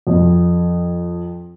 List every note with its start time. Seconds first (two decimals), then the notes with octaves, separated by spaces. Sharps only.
0.07 F2